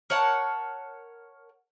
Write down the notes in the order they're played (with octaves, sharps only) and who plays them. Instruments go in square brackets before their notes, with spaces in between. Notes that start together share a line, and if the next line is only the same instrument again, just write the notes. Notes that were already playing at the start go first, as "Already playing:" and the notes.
[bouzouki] A#4 C#5 F#5 A5